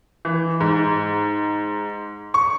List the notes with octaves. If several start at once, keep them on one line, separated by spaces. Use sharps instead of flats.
E3
G#2
C#6